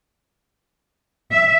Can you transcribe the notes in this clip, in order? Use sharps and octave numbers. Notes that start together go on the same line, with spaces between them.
E5